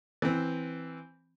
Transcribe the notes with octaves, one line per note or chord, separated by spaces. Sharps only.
E3 C4